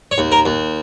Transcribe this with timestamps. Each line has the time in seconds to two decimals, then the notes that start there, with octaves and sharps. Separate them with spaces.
0.11 C#5
0.18 D#2
0.32 A#4
0.45 D#2